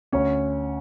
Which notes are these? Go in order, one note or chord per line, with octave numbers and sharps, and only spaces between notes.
D2 C#4 C#5